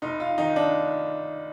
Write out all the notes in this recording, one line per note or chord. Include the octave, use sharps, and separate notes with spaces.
F1 D#4
F4
D#3 D#4
D4